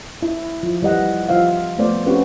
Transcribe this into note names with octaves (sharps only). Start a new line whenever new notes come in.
E4
F3
E3 G3 D#5 F#5
F3 F4 C5 E5 F5
F3 A3 B3 C5 D5
C4 C#4 F#4 G4 B4